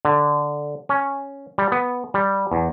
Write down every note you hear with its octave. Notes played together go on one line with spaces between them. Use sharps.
D3
C#4
G3
B3
G3
E2